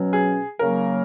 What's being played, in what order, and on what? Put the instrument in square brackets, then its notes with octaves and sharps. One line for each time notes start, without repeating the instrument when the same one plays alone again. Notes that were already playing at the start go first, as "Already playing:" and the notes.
Already playing: [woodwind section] B2 F#3 C#4
[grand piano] G#4
[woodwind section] C#3 F#3 A#3 [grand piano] A#4